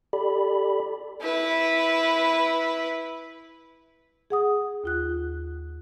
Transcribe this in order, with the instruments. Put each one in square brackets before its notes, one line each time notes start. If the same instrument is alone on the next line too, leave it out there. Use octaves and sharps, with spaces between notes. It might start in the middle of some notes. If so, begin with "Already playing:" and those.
[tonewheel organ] G4 A4 D5 B5
[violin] E4 B4
[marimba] G#4 F#5 D#6
D#2 F4 F#6